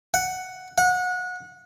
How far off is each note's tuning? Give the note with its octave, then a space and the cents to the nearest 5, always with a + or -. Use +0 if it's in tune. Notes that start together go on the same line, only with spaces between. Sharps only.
F#5 +5
F#5 -25